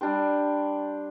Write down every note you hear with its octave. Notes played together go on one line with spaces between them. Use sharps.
G3 D4 G4 C5